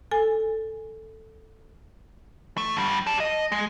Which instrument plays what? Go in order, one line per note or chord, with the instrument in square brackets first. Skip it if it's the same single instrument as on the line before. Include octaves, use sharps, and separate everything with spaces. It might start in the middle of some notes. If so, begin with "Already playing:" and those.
[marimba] A4 G#5
[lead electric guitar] A3
D3 G3
G4 A5
D#5
G#3